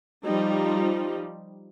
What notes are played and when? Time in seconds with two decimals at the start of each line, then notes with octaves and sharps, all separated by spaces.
0.24 F3 G3 D#4